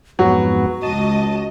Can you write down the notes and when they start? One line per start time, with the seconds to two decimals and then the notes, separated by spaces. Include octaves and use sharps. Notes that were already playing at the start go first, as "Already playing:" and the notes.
0.19 F2 G#2 F#3 B3 F#4
0.83 C#2 D#5 A5